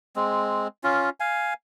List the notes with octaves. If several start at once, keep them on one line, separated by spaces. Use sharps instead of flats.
G#3 C4
C#4 F4
F5 G#5